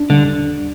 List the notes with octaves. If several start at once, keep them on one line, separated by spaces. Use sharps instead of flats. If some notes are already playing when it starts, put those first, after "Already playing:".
Already playing: D4
D3 G3